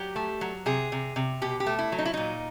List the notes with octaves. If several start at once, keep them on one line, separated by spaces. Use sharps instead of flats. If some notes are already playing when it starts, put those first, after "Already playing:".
Already playing: F#3 G4
A3
F#3
C3 G#4
C3
C3
B2 G4
G4
A3
E4
F#3
D#4
E4
A#2 D#4